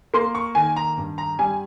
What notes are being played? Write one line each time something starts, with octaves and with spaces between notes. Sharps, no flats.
A#3 C6
C#6
D#3 G#5
A#5
G2
A#5
G3 G#5